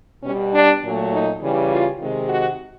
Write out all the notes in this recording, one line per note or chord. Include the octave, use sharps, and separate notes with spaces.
B2 G3 C#4
D4
A#2 F#3 A3
D#4
C#3 E3 G3
F4
C3 D#3 G#3
F#4